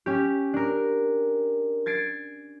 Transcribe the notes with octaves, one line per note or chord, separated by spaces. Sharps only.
C#4 G4
D4 A#4
G#6 A6 C7 D7